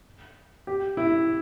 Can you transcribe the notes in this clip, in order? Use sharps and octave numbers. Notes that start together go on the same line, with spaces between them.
G4
E4